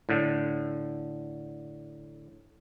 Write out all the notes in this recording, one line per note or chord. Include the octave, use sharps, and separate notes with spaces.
A2 D3